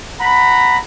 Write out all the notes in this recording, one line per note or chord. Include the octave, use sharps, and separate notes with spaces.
F#5 A#5 B5